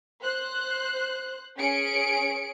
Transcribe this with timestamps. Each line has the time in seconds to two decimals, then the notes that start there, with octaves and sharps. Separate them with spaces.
0.22 C5 F#6
1.58 C#4 G#4 C#7 D7